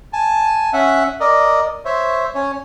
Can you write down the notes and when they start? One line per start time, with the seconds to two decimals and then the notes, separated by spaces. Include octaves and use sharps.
0.13 G#5 A5
0.73 C#4 E5 F#5
1.20 A#4 D5 D#5
1.85 C5 C#5 E5
2.35 C#4 C#5